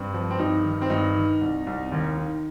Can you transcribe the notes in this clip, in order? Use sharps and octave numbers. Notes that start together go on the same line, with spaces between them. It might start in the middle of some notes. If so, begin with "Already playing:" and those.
Already playing: G2 C4
F3
C4
G2 D#4
D#3
C4
G2 D#4
D#3
C2
C2
D#2
D#3